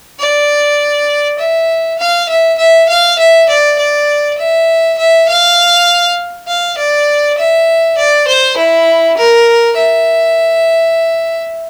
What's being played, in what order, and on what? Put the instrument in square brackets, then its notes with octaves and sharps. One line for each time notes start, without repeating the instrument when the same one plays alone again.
[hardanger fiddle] D5
E5
F5
E5
E5
F5
E5
D5
D5
E5
E5
F5
F5
D5
E5
D5
C5
E4
A#4
E5